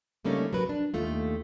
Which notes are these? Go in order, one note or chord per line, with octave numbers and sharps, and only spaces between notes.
C#3 G3 A3 A#3 C#4 D#4
F#3 A#4 B4
D4
D#2 A3 F4